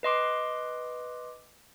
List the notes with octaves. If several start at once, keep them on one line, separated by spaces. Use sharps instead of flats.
B4 D#5 C6 D6